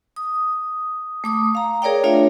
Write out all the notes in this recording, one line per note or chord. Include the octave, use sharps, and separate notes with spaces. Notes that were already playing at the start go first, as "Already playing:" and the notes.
D#6
A3 D6 D#6
F5 A#5
G#4 A#4 C#5 D5 F5 G5
A3 D4 F4 C#5 D5 E5